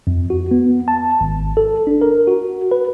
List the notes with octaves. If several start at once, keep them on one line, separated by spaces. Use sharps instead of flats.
F2
F#4
B3
A5
G#1
A4
D4
A#4
F#4
B4